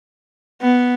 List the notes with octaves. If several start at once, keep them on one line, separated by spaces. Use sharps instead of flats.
B3